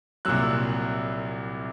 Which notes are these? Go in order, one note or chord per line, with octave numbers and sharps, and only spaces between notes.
C2 A#2 F#3 E6 F#6